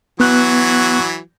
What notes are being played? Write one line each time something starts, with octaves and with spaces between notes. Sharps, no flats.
E3 F#3 B3 F#4 F#6